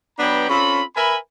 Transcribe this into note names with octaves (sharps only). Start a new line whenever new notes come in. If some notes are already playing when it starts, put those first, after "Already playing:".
F#3 B3 D4 B4 G5 A#5
C4 C#4 F4 A4 B5
A#4 B4 E5 G#5 B5